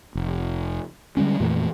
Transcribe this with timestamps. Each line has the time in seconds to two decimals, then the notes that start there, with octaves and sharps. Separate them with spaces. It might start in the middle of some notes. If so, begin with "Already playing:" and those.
0.15 F1
1.17 D3 G3 G#3 C#4
1.40 F2 A#2 E3 A3